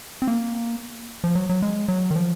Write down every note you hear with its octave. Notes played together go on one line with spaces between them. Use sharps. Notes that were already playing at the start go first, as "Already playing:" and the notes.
C4
A#3
F3
F#3
F#3
G#3
F#3
D#3
F3